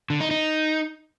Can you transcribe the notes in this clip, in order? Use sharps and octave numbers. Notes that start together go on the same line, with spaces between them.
D3
D#4
D#4